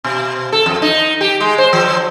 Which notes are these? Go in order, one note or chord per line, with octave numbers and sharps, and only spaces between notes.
B2
A4
F2
D#4
G4
G#3
C5
F3